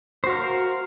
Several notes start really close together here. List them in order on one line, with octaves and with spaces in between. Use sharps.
C5 F#4 F5 A#4